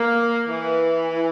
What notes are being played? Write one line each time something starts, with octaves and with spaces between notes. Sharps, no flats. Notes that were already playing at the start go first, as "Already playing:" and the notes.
Already playing: A#3
E3